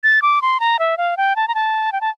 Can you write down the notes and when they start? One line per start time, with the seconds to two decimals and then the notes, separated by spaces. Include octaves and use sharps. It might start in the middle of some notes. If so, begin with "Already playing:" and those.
0.04 A6
0.22 D6
0.42 C6
0.60 A#5
0.79 E5
0.98 F5
1.17 G5
1.36 A5
1.48 A#5
1.55 A5
1.92 G5
2.01 A5